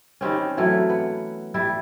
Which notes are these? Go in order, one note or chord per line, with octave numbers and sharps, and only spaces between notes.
D#3 G3 C4 C#4
E3 F#3 A3 E4
B3
G3 E4 E5